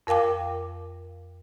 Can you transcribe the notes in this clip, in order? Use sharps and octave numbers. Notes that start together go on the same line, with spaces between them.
F2 A#4 F5 G5 D6